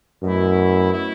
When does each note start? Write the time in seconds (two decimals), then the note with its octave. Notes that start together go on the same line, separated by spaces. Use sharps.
0.23 F#2 B2 A3 E4
0.89 B2 A3 E4